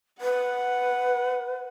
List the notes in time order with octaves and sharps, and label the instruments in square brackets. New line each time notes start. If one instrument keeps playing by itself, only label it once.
[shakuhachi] B4 [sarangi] F#5